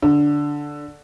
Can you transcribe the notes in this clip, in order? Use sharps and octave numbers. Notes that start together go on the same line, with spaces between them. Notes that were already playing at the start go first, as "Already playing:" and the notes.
D3